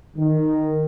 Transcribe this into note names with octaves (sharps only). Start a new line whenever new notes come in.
D#3